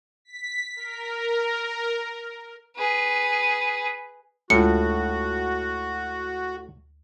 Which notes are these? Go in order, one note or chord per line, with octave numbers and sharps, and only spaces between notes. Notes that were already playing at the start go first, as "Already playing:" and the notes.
B6
A#4
G#4 B4
D2 A2 G#3 F4 F#4 C#7